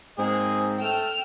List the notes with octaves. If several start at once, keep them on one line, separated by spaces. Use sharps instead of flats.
G#2 A#3 C4 G#4 D#5
A3 G5 E6 F6